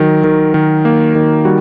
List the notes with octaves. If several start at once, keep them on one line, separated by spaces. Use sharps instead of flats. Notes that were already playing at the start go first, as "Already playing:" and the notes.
Already playing: D#3 F#3 A#4
D#3
D#3
A#3
D#3
G3 F#4